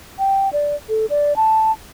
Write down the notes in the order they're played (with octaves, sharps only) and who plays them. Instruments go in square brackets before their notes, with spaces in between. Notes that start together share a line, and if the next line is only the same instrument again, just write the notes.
[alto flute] G5
D5
A4
D5
A5